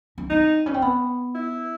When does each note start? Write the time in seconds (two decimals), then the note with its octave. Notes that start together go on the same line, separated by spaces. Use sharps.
0.18 C#4
0.30 C4 D#4
0.66 C#4
0.74 C4
0.82 B3
1.35 E4